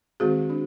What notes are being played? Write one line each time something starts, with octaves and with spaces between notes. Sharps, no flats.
D#3 G#3 C4 F#4 G#4
D4